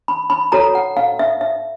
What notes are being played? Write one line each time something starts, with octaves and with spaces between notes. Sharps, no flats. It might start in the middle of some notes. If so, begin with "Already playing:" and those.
B5
B5
F#4 A4 C#5 A#5
F#5
F5
E5
E5